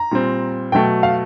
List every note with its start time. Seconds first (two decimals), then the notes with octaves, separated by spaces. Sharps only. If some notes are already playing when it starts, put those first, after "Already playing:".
Already playing: A#5
0.11 A#2 G3 C4
0.72 B2 F#3 A3 G5
1.03 F5